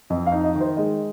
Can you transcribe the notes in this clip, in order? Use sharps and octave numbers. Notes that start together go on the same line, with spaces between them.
F2 D#5
F5
D#4
D#5
D#3
C5
G#3 D#5